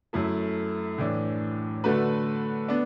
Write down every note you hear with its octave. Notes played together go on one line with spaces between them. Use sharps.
F#2 F#3 A3 E4 A4
A2 E3 D4
D3 A3 F#4 B4
B3 D4